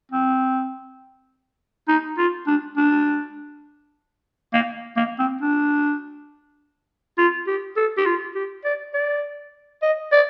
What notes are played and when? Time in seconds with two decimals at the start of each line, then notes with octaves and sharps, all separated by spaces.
0.12 C4
1.88 D#4
2.18 F4
2.47 D4
2.77 D4
4.53 A#3
4.97 A#3
5.19 C4
5.41 D4
7.18 F4
7.47 G4
7.77 A4
7.97 G4
8.06 F4
8.35 G4
8.65 D5
8.94 D5
9.82 D#5
10.12 D5